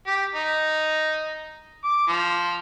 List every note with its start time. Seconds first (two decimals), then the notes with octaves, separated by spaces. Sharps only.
0.07 G4
0.35 D#4
1.84 D6
2.08 F3